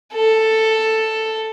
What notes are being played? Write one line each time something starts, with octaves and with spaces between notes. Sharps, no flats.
A4